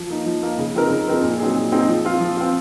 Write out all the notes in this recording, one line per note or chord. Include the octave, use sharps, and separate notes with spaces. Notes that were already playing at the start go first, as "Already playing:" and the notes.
Already playing: F3
A#3 D#4
F3
A#3 D#4
C#3
F3 C4 D#4 A#4
C#3
F3 C4 D#4 A#4
A#2
F#3 C4 D#4 G#4
A#2
F#3 C4 D#4 G#4
F3
C4 F4
F3
C4 F4